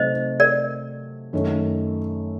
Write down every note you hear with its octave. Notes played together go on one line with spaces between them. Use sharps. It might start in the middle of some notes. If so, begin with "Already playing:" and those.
Already playing: C3 F#3 A3 D#4 C5 D#5
A#4 D5
F#2 D#3 A3